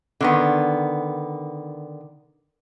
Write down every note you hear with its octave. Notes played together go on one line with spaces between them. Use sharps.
D3 D#3 B3